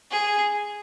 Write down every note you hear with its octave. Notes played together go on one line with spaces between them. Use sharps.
G#4